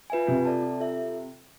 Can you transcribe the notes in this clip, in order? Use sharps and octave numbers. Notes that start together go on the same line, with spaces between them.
F4 B4 E5 G#5
C3 F4
A4 D5 A5
C4
F4 A4 E5